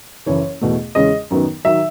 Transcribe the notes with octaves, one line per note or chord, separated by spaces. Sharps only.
F#1 F#2 E3 C#5
E2 B2 A3
E2 C#3 G#3 C#4 D#5
F#2 D#3 F#3 B3
D#3 F#3 E5